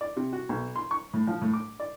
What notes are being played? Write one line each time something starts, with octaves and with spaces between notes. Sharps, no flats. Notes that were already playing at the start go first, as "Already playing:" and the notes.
D5
C3
F#4
B1
C6
C#6
A2
F3
A2
D6
D5